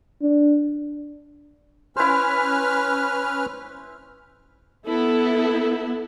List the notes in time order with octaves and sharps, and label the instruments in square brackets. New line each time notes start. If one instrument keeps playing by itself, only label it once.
[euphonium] D4
[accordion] C#4 B4 F6 [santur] E4 C5
[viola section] B3 E4 A4